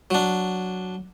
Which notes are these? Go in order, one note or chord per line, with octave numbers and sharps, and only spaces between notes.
F#3 D4